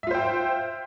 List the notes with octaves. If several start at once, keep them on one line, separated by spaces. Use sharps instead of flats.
F4 C5 E5 G5